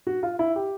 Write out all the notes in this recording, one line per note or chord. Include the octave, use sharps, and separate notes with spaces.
F#4
F4
E4
G4